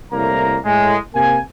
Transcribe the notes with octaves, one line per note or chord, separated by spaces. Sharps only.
C2 A2 A#3 A#5
A2 G#3
C3 A#3 G#5